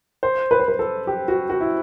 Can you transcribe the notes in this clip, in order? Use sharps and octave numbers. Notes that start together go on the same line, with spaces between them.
C5
B4
C5
B4
A4
G4
F#4
F#4
E4